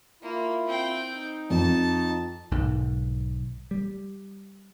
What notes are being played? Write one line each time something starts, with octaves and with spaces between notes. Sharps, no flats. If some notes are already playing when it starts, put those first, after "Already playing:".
A#3 E4 F4
C4 G5
D#4
F2 A5
B1 G#2 D#3
G3